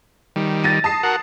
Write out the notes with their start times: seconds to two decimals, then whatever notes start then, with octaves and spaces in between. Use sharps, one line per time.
0.36 D#3 G3
0.64 A6 A#6 D#7
0.84 A5 D#6 C7
1.03 F#4 A#4 F#5